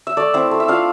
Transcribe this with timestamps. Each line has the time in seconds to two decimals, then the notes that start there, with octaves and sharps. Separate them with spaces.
0.07 E5
0.17 A3 D5
0.34 C4 E4 E5
0.51 A3
0.60 E5
0.68 D4 F4 F5